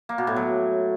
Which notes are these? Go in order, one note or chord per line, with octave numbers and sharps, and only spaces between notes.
A#3
B2
A2
F#3